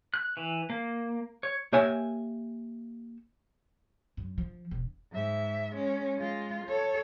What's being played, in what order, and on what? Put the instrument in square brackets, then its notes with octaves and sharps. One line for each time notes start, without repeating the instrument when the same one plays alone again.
[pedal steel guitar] F#6
E3
A#3
C#5
[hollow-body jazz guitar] A#3 G4 C#5 E5 G#5
[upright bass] F#2
F3
E1
[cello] G#2 E5
G#3 C#4
G#3 F4
A4 C#5